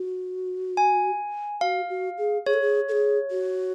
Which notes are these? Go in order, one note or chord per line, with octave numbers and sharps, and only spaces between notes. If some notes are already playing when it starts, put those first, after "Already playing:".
Already playing: F#4
G#5
F#4 F5
F#4
G#4
G#4 C#5
A4
G#4
A4
G#4
F#4